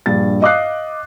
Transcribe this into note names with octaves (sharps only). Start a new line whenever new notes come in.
A#1 G2 A6
D#5 F5 D6 D#6 F#6 C7